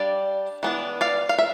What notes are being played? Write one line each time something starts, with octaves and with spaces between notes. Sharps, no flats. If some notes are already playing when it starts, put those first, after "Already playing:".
Already playing: G3 D4 D5 F5
E3 B3 D4
D5 F5
F5
E5